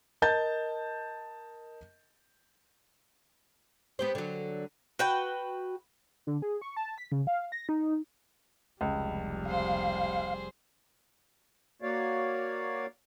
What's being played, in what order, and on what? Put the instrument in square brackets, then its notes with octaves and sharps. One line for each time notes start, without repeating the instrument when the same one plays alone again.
[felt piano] A#4 D#5 A5 G6 A6
[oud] B3 G4 C5
D3 F#3
[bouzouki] F#4 B4 G5
[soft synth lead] D3
G#4
C#6
A5
B6
C#3
F5
A#6
D#4
[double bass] F1 G3 [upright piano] C#2
[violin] G#4 C5 [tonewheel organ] F5
[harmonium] A#3 F#4 C#5 D5 F5